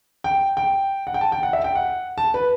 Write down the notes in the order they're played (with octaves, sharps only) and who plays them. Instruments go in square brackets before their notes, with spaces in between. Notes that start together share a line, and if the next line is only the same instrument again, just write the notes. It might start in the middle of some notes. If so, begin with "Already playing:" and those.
[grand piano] G5
G5
F#5
G5
A5
G5
F#5
E5
G5
F#5
A5
B4